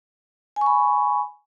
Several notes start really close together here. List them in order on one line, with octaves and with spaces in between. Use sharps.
G#5 C#6 B5